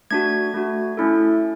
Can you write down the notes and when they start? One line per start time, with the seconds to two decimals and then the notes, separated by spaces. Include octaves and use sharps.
0.11 A3 D4 F#4 G#6
0.54 A3 D4 F#4
0.97 A3 C#4 E4 A4